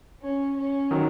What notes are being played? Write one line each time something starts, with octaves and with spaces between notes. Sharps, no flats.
C#4
C#4
D#3 F#3